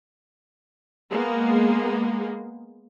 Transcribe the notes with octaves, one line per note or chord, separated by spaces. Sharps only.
G#3 A#3 B3